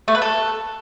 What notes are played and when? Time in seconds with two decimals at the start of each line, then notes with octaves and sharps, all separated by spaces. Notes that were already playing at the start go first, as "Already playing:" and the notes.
0.08 A3
0.15 B4
0.22 A4